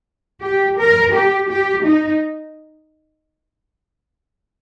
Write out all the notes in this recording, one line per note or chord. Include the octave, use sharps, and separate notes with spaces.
G4
A#4
G4
G4
D#4